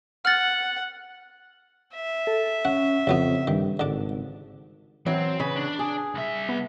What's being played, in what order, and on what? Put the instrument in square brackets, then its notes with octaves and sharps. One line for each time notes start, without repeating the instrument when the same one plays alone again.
[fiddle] F#5 [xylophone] F6 A6
[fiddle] E5
[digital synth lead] A4
[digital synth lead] C#4 [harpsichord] F#5
[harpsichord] A1 F#3 B3 [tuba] F2 [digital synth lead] C#3
[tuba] G2 [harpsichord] D#3
[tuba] G#1 [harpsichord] D3 D4
[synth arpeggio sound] E3 [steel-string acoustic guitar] F#3 [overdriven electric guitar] C4
[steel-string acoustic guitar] C#3 [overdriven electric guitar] B4
[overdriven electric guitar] D4
[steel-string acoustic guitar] G#4
[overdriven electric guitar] C2 E5
[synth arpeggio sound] B3